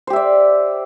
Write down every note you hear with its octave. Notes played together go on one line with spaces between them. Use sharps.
G4 C5 D5 E5